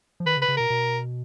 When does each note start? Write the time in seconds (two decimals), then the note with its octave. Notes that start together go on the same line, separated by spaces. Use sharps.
0.20 F3
0.26 D#3 B4
0.37 C#3
0.42 B4
0.48 C#3
0.57 B2 A#4
0.70 B2